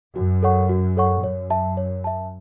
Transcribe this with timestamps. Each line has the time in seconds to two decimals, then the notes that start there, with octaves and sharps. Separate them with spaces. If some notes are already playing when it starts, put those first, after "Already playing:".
0.16 F#2 F#4
0.43 A4 C#5 F#5 C#6
0.69 F#4
0.97 A4 C#5 F#5 C#6
1.23 F#2 C#5
1.50 E5 A5
1.77 C#5
2.04 E5 A5